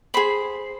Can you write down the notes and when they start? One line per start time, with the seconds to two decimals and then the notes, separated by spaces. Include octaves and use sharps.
0.14 G#4 C5 B5